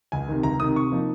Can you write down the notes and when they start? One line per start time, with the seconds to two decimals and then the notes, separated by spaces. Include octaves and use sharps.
0.12 C#2 G#5
0.28 C3 D#3
0.43 C#2 A#5
0.60 C3 D#3 D#6
0.76 C3 C#6
0.91 F3 A#3 D#4